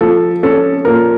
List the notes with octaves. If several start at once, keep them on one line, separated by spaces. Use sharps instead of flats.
F3 A4
C#4 A4
A#2 A#4